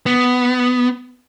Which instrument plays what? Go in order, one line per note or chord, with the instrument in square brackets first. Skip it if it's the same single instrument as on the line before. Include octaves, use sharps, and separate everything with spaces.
[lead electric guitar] B3